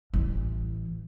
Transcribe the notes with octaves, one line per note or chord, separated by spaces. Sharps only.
A1 E3